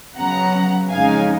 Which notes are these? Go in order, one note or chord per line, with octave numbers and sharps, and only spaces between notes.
C#3 F#3 B3 F#5 A#5
F2 C#3 G#3 D#4 F5 G#5